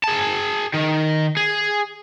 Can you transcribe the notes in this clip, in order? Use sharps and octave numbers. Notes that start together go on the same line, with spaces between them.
G#4 A5
D#3
G#4